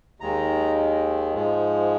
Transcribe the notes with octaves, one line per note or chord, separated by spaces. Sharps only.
D#2 D#3 G#3 A#5
G#2 F3 G#3